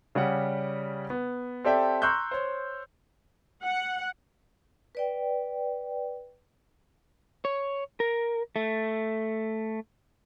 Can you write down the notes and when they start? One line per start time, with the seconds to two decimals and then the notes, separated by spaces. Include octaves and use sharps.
0.15 C#3 G3 G4 F#5
1.10 B3
1.64 C4 G4 A4 D5 E5 G5
2.02 A#5 C6 C#6 E6 F#6 G6
2.31 C5 C#5
3.63 F#5
4.95 B4 D5 G5
7.45 C#5
8.00 A#4
8.56 A3